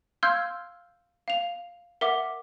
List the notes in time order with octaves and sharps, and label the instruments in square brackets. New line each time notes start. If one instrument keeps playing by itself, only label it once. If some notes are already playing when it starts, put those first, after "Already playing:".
[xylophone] F5 C6 E6 F6 G6 G#6
F5 F7
A#4 E5 F#5 D6